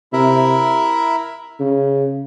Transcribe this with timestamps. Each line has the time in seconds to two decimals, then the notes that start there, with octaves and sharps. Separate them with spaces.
0.13 C3 E4 A#4 E5
1.60 C#3